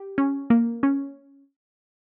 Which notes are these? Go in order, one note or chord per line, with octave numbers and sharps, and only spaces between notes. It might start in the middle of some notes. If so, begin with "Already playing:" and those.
Already playing: G4
C#4
A#3
C#4